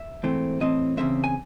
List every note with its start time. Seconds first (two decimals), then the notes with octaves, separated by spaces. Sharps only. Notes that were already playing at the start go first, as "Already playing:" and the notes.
Already playing: E5
0.23 G#2 E3 A3 C4
0.60 A2 E3 C4 D#5
0.97 E2 C#3 G#3 C4 E5
1.24 G#5